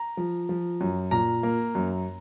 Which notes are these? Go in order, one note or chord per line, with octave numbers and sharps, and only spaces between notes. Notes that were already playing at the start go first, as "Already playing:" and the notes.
Already playing: A#5
F3
F3
F#2
A#2 A#5
A#3
F#2